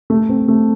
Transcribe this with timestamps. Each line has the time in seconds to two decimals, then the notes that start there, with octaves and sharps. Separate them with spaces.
0.10 A3
0.29 C4
0.48 A3